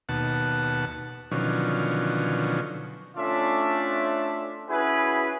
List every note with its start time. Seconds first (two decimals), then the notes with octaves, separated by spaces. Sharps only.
0.09 D#2 B2 F#5 A5
1.31 B2 D3 D#3 F3 F#3 C#4
3.17 A3 C#4 D4 F4 D5 E5
4.70 C#4 E4 F#4 G#4 B4